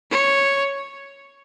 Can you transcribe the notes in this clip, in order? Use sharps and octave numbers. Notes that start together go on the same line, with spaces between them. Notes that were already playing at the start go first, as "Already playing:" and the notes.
C#5